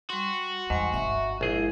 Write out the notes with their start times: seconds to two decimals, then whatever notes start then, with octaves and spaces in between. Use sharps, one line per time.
0.10 G3 F#4 C6
0.70 E2 G#2 G3 G#5
0.94 G1 G2 E5
1.41 A#1 G#3 E4 G#4